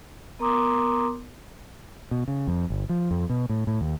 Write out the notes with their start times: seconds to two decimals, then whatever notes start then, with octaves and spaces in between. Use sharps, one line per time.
0.39 B3 A#4 A#5 C6 D6 D#6
2.11 B2
2.28 C#3
2.48 F2
2.70 G1
2.89 F3
3.11 F2
3.30 B2
3.49 A2
3.67 A2
3.81 D#2